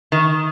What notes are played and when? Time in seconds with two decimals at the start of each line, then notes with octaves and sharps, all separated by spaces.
0.12 D#3